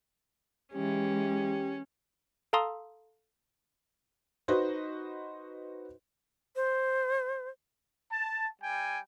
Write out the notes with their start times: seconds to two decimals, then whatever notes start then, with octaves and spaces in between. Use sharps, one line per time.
0.74 E3 G#3 C#4 G4
2.53 A4 F5 A5 A#5 C6 D#6
4.48 D#4 F#4 B4 C5
6.56 C5
8.11 A5
8.61 G3 G5 G#5